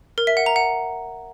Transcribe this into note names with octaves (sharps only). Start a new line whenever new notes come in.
A#4
E5
F#5
A#5
F#5